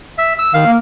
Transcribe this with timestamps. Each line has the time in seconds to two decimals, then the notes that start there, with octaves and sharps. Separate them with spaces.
0.18 E5
0.39 E6
0.54 D#3 F5
0.66 A#3